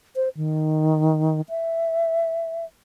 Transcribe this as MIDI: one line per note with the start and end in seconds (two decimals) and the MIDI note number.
0.16 0.29 72
0.37 1.41 51
1.49 2.65 76